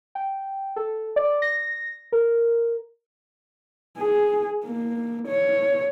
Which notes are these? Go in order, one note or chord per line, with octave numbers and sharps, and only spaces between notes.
G5
A4
D5
A#6
A#4
G#4
A#3
C#5